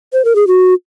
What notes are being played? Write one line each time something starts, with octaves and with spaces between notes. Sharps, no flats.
C5
A#4
G#4
F#4